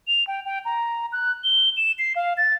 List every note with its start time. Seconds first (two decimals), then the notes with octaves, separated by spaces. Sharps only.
0.08 F7
0.27 G5
0.45 G5
0.65 A#5
1.12 F#6
1.44 G7
1.77 E7
1.99 C7
2.16 F5
2.37 A6